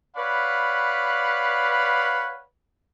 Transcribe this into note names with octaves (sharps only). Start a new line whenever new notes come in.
B4 C#5 D5 F5 F#5 B5